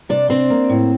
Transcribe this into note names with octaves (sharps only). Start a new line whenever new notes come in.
C3 D4 D5
C4 D4 C5
A#3
A2